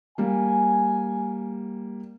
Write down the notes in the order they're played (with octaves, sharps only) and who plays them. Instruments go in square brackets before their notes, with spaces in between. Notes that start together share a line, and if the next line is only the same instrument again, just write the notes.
[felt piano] G3 A#3 [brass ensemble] G#5